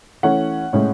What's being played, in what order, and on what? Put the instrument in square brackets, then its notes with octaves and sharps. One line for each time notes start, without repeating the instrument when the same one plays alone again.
[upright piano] E3 A3 C#4 F#5
A2 G#3 C#4